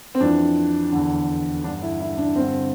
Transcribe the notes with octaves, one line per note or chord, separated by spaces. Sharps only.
C4
F2 E3 D4
E2 D3
G2 D3 D4
E4
E4
D4
G2 D3 C4